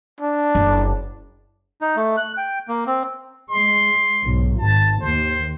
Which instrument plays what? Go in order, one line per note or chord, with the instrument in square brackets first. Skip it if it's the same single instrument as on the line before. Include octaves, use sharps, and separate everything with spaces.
[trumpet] D4
[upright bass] F#1
[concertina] D#4
A3
F#6
G5
A#3
C4
[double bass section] G#3 [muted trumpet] C6
[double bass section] B1 G#2
[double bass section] G#1 [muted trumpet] A5
[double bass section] D#2 [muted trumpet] C5